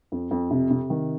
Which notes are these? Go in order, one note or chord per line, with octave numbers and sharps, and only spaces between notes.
F2
F2
C3
C3
D#3